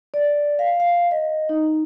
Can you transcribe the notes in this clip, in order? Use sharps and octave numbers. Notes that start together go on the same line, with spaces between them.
D5
F5
F5
D#5
D#4